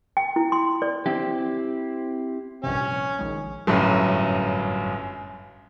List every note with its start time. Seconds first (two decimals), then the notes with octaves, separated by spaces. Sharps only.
0.17 G5
0.36 E4
0.52 C6
0.82 D5
1.06 C4 E4 G4
2.64 A#1 G2 C3 C#4
3.19 A#1 D#3 G#3
3.67 G1 F#2 A2